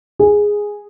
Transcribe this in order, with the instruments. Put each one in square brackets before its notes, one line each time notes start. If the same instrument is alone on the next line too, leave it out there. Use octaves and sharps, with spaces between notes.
[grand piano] G#4